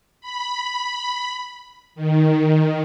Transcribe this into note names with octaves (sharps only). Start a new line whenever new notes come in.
B5
D#3